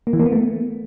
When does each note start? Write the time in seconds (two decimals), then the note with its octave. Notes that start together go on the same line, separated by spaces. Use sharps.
0.07 A#3
0.13 E3
0.20 A#3
0.26 B3
0.32 A3